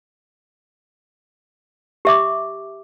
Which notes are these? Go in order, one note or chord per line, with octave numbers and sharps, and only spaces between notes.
G4 E5 D6